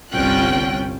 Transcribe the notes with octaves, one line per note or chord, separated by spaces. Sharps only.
G1 C2 C#4 F4 G5 F#6